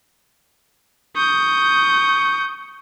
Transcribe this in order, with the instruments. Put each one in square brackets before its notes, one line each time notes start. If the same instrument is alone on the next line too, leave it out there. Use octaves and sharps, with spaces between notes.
[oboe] C#6 [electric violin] D#6 G6